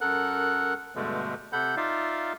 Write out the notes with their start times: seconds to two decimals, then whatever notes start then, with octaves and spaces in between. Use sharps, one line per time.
0.01 F#2 A4 A#4 F#5 F#6
0.95 G2 B2 D3 G#3 A3
1.53 C3 A4 F#5 B5 G6
1.77 D#4 F4 D5 E5 F5